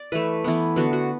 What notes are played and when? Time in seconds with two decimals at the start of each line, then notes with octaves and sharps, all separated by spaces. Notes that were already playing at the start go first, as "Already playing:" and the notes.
Already playing: D5
0.12 E3 A3 B4
0.44 E3 B3
0.76 D3 B3 F#4
0.93 F#4